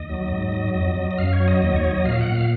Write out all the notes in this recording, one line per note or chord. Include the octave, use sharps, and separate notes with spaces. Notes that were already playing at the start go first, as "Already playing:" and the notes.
Already playing: D#2 D#5
F#3
G#2
F#3
F2 D#5
F#3
D#5
F#2 F5
C#5
F#3
D#5
D#2 D#5
C#5
F#3
D#5
A#2 F5
F#5
A#2
F5